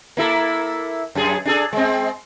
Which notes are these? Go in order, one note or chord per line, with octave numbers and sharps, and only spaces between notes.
A#3 E4 A4
F#2 G#4
D4 G#4 A4
G#3 C4